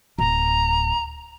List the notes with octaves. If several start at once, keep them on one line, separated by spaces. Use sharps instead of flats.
D1 A#5